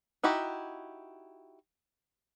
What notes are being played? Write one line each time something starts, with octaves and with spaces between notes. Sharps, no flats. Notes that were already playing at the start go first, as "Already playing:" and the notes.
D#4 E4 F#4 G4